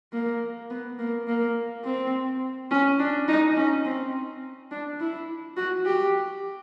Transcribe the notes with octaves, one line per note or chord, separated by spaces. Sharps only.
A#3
B3
A#3
A#3
C4
C#4
D4
D#4
C#4
C4
D4
E4
F#4
G4